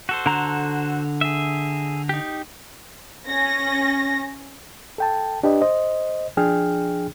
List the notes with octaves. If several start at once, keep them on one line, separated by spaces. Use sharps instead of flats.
F#4 A4 C5
D3 A#5
G#4 E5
D#4 G4
C#4 A#6
A4 G5 A5
D4 G4 B4 D#5
C5 D#5
F3 D4 G#4 G5 F6